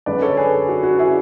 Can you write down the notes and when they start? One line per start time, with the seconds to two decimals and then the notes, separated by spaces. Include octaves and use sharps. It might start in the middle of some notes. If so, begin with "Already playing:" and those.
0.06 F#2 D3 G#3 B4 D5
0.22 A4 C#5
0.37 G#4 B4
0.69 F#4
0.83 F#4
0.99 E4 G#4